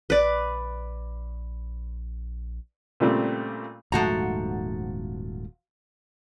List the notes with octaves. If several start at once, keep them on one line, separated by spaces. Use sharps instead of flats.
A#1 B4 D5
A#2 C#3 G3 A3 C4
D#1 G#2 F3 A3 F#4 A#5